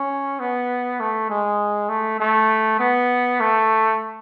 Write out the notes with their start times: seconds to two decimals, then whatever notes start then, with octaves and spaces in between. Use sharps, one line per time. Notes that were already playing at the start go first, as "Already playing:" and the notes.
Already playing: C#4
0.40 B3
1.00 A3
1.30 G#3
1.89 A3
2.20 A3
2.80 B3
3.41 A3